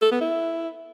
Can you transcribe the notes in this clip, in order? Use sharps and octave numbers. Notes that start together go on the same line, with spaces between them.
A4
B3
E4